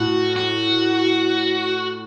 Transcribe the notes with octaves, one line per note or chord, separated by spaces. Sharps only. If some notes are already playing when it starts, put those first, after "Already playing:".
Already playing: A2 F#4
F#4